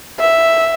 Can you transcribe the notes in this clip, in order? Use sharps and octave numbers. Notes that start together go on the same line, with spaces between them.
E5